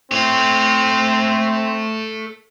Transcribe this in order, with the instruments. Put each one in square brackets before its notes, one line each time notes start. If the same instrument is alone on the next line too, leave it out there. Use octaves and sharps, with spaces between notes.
[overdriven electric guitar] A3 C#5 [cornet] C4